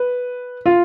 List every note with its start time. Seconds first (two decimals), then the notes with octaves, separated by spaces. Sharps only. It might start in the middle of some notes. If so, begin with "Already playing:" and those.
Already playing: B4
0.66 F4